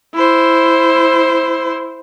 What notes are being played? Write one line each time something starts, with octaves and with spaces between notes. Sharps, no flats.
E4 C5